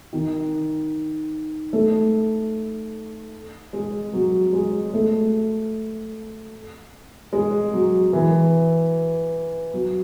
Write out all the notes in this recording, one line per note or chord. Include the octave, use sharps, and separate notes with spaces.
D#3
A3
G#3
F#3
G#3
A3
G#3
F#3
E3
F#3